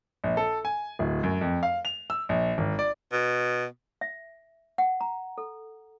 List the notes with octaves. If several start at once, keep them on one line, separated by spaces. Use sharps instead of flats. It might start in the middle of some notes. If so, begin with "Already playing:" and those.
A#1
A4
G#5
D1
F#2
F2
F5
F7
E6
A#1
G#1
D5
B2
E5
F#5
A#5
A4